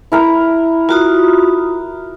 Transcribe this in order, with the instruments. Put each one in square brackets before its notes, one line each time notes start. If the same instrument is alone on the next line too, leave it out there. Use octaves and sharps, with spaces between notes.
[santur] E4 A#4 A#5
[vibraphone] F4 F#4 D#6 [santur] A#4